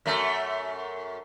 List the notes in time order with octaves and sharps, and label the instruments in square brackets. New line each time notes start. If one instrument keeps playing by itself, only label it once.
[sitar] F#2 A3